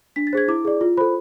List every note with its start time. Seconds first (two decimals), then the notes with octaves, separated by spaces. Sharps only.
0.16 D4 B6
0.27 A6
0.33 G#4 C5 G#6
0.48 E4 D6
0.65 G#4 D5
0.81 F4
0.97 A4 C5 B5